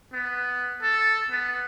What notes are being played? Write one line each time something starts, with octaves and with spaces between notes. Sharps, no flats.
B3
A4
B3